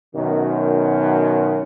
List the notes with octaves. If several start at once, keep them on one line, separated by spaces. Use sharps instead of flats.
F#2 B2 D#3